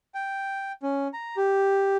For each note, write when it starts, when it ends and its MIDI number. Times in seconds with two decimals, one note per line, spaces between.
0.14 0.72 79
0.83 1.08 61
1.13 1.36 82
1.37 1.97 67